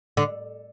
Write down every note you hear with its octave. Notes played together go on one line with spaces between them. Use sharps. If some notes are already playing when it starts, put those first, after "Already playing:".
D3